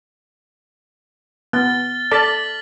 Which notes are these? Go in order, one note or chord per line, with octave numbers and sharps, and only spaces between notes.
B3 F6 A6 G7
A4 D5 A5 F6 B6 F#7